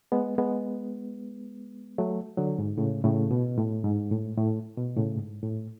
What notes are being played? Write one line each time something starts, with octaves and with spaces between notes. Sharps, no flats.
G#3 B3
G#3 B3
F#3 A3
D3 F#3
G#2
A2 C#3
A2 C#3
B2
A2
G#2
A2
A2
B2
A2 C#3
G#2
A2